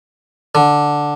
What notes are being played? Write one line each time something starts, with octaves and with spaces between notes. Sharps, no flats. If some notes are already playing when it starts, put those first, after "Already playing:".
D3